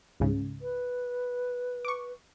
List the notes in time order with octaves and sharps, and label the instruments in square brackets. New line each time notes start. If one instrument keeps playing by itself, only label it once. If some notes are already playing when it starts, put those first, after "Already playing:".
[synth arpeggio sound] C#2 G#2 C#3
[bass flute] B4
[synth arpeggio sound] C#6 D6